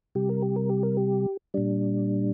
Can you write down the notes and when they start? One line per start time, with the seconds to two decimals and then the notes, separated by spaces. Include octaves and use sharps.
0.15 C3 G3 G4
0.29 A#4
0.42 G4
0.56 A#4
0.69 G4
0.83 A#4
0.97 G4
1.54 A#2 G3 D4